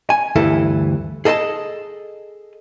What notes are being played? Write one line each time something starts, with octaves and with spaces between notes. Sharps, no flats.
G#5
D2 G2 E3 E4 A4
G#4 A4 D#5 G5 A5